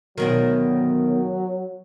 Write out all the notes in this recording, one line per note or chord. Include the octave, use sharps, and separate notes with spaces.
D2 B2 D#3 F#3